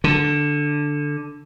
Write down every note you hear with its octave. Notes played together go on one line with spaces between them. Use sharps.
D3